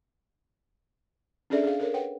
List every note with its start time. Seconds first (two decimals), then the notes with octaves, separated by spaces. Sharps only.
1.50 C#4 D4 G#4 A4 D5 E5
1.64 G#4 F5
1.79 A4 A#4 C#5
1.94 B4 C#5 F#5 G5